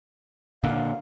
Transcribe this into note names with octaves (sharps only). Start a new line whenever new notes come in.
A#2 D3 F5